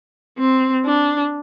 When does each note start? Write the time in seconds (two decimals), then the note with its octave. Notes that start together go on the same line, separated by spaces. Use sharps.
0.38 C4
0.85 D4